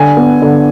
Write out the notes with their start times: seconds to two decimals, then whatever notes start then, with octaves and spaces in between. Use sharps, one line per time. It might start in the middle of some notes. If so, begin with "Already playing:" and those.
Already playing: D3 G#5
0.17 B3
0.42 D3